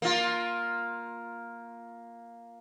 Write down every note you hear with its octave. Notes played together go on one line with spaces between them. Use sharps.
A#3 F4